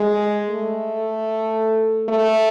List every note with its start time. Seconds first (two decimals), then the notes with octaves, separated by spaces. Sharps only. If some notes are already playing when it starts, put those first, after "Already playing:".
Already playing: G#3
0.50 A3
2.09 A3